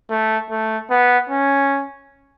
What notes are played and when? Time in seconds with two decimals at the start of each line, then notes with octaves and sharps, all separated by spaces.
0.10 A3
0.50 A3
0.91 B3
1.30 C#4